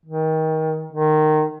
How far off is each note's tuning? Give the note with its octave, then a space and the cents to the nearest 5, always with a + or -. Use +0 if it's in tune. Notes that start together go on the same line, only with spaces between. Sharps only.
D#3 +25
D#3 -15